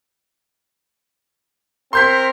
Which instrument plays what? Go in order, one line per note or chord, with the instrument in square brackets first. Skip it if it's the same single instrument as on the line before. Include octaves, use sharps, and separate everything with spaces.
[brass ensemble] C4 A#4 [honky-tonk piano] C6 G6 B6